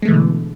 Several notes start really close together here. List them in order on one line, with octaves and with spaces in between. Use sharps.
G#3 A3 E3 B2 D3